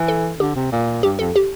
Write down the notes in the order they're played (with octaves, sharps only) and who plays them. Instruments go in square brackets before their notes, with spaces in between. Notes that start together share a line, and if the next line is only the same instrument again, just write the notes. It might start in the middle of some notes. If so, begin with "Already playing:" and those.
Already playing: [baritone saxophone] E3
[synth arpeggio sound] A4
[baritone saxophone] D3 [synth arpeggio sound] G4
[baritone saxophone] C3
A#2
[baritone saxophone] G2 [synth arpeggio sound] G4
[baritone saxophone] F2 [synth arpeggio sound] A4
[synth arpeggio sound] G4